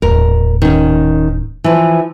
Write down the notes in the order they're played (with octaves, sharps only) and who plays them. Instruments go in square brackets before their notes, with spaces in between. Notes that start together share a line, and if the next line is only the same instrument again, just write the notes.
[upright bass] D#1 A2 [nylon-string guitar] A#4
[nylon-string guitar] D#3 C#4
E3 F3